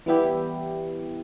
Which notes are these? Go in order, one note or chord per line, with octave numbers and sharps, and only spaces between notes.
E3 G3 B3 E4 G4